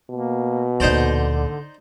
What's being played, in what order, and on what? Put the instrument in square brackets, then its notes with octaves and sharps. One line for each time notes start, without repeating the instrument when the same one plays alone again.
[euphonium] B2 [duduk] A#3
[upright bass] D2 A#2 [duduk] D3 [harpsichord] D#4 C5 D5